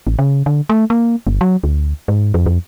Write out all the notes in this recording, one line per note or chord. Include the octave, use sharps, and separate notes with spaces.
A1
C#3
D3
A3
A#3
G1
F#3
D2
G#2
F2
F2